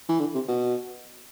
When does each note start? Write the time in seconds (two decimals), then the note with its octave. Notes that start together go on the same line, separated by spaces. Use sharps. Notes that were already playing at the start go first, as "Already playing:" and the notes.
0.09 E3
0.20 D3
0.35 C3
0.49 B2